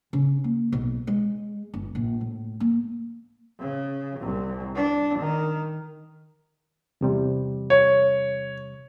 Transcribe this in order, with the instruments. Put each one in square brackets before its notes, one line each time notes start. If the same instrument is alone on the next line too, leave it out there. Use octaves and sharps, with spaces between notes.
[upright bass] C#3
A#3
B1
G#3
G1
A#1
A2
A#3
[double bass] C#3
C2
D4
D#3
[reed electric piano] E2 C3 G3
[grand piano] C#5